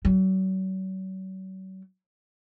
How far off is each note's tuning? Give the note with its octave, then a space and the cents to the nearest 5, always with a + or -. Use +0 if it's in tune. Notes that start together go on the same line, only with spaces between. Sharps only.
F#3 +40